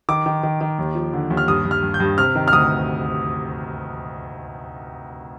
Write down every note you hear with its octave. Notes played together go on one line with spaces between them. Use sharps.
D#3 D6
D#3
D#3
D#3
D#2
F3
D3
D#2
F6
G2 D#6
G2
F6
G2
G6
G2
C3 F6
D#3
F6
D2 D#6